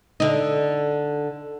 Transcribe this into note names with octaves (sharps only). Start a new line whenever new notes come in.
D3 D#4